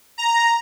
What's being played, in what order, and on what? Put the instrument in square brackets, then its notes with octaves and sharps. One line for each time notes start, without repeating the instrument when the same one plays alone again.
[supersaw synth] A#5